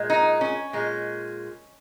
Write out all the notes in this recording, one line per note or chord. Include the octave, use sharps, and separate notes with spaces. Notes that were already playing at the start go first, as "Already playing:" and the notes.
Already playing: A#2 G#3
D#4
C#4
A#2 G#3